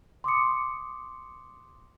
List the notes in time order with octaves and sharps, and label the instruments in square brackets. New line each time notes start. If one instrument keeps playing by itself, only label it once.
[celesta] C6 D6 D#6 C#7